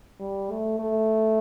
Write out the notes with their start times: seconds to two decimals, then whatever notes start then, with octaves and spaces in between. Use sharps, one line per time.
0.20 G3
0.51 A3
0.79 A3